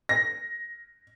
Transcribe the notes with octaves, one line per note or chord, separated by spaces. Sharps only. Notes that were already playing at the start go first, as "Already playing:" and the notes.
A#6